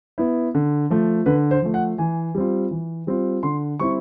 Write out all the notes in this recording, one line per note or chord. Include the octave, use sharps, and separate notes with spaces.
B3 E4
D3
F3 A3
D3 B4
C5
F3 A3
F#5
E3 G#5
G3 C4 F4
E3
G3 C4 F4
D3 C6
G3 C4 E4 C#6